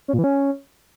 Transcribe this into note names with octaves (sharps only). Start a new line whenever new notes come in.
C#4
A#2
E3
C#4